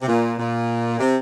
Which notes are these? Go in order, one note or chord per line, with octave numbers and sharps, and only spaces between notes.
C3
A#2
A#2
C3